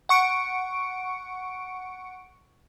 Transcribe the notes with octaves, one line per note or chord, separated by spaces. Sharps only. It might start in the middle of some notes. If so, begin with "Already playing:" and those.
F#5 C#6 C#7 D7